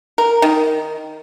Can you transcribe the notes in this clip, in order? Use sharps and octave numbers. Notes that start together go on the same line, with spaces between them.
A#4
D#3